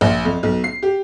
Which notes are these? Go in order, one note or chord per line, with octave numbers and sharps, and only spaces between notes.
A#1
F2
B1
C7
G4